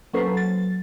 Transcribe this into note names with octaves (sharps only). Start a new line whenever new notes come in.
F#3 A#3 C#4 A4 B4 C5
F#3 A6